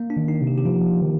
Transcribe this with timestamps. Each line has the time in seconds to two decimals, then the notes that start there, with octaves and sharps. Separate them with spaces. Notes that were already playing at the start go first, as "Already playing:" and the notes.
Already playing: A#3
0.10 D4
0.16 D#3
0.28 D#4
0.41 C3
0.47 G4
0.58 G4
0.65 F3 F4
1.02 D#3